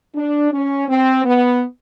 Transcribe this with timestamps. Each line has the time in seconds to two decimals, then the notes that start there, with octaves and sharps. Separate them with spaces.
0.15 D4
0.52 C#4
0.88 C4
1.25 B3